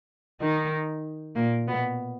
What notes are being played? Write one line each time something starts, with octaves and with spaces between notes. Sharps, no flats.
D#3 D#4
A#2 A#3
B2 B3